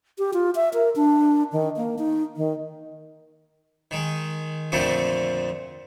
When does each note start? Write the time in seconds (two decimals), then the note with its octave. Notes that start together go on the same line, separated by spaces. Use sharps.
0.18 G4
0.34 F4
0.55 E5
0.74 A#4
0.96 D4
1.52 D#3
1.77 A#3
1.99 D#4
2.37 D#3
3.91 D#3 G#3
4.72 F2 A#2 D3 F3 A3 C4